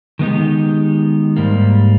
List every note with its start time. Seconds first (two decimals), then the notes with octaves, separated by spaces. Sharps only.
0.19 D#3 G#3 B3 D#4 G4
1.36 G#2 G3 A#3